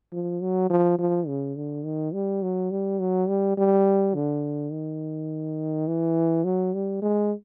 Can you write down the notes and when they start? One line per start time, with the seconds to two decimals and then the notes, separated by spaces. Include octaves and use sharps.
0.12 F3
0.41 F#3
0.70 F3
0.99 F3
1.27 C#3
1.56 D3
1.85 D#3
2.14 G3
2.42 F#3
2.71 G3
3.00 F#3
3.28 G3
3.57 G3
4.15 D3
4.72 D#3
5.87 E3
6.44 F#3
6.74 G3
7.02 G#3